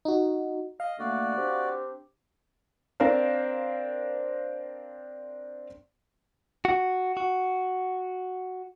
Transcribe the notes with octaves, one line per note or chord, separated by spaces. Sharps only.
D#4 F#4
D#5 F5
D3 A3 A#3 F#4 D5
C4 D4 G4
C4 D4 A#4 C5 F5
F#4
F#4